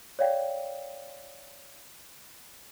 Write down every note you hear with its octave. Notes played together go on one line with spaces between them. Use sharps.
C#5 D5 F5 G5